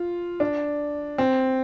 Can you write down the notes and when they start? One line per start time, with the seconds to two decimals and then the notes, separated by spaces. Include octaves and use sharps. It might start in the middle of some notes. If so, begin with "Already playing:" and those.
Already playing: F4
0.40 D4
1.18 C4